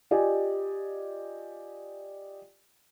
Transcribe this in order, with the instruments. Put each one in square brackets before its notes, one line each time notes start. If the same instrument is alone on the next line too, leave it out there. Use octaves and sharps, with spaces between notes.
[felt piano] F4 G4 D5 D#5 G#5